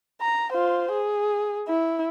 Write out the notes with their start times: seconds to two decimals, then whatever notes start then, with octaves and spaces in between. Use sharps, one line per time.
0.21 A#5
0.52 F4 C5
0.92 G#4
1.69 E4